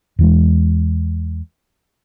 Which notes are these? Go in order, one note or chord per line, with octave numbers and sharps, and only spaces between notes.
E2 E3 G#3